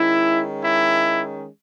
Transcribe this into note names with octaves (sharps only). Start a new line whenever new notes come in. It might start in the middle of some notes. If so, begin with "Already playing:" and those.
Already playing: D#3 G#3 C#4 E4
E4